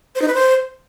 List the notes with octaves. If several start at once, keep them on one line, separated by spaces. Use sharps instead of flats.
C5
D#4
B4
C5